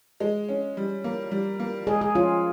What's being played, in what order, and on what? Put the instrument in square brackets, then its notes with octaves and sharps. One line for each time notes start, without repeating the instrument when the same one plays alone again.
[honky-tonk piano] G#3
C#4
G3
A#3
G3
A#3
[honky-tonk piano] G#3 [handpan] G#4
[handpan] G#4
[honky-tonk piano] C#4 [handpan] F4